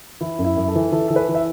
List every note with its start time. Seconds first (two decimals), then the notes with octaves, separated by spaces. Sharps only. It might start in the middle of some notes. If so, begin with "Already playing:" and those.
0.21 E3 E4
0.39 F#2
0.44 E4
0.57 F#2
0.68 A4
0.75 E3
0.92 E3 A4
1.08 E3 A4
1.16 B4
1.29 E3
1.35 E5